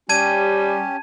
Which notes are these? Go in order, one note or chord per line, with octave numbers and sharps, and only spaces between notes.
G3 C#4 G4 A5 G#6 D#7